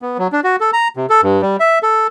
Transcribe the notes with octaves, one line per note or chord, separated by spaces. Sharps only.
B3
F#3
D4
F#4
A4
A#5
C3
A4
G2
G3
E5
A4